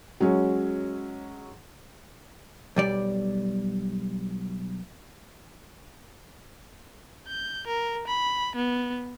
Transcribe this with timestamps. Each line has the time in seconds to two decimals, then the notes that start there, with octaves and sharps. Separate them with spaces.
0.21 F#3 G#3 C#4
2.76 B1 G3 D5
7.28 G6
7.67 A#4
8.08 B5
8.56 B3